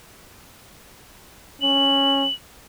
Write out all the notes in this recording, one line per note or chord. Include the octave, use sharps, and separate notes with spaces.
C#4 F#7